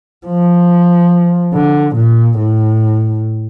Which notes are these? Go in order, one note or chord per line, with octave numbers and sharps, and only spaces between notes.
F3
D3
A#2
A2